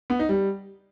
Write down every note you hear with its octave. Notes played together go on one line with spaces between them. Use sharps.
B3
D#4
G3